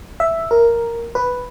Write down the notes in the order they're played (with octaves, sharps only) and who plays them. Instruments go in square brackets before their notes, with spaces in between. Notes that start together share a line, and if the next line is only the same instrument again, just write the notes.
[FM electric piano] E5
A#4
B4